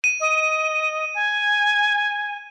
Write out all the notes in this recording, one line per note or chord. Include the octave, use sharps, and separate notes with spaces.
D#7
D#5
G#5